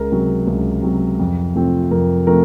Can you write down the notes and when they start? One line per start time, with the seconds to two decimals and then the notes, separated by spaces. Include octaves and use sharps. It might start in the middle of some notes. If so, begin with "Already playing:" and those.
Already playing: C#2 A#4
0.12 C3 F#3
0.47 C#2
0.83 C3 F#3
1.19 F2
1.55 C3 F3 A3 C4
1.91 F2 A#4
2.27 C3 F3 A3 C4 A#4